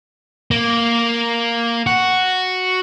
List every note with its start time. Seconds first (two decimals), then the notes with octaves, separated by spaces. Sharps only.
0.51 A#3
1.87 F#4